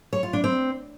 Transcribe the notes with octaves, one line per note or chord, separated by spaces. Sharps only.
C#5
F4
D4
C4